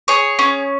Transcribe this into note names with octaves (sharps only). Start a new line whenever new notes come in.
G#4 C#5
C#4